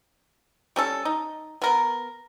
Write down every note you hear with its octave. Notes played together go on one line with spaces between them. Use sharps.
G3 C#4 A4
D#4
B3 A#4 B4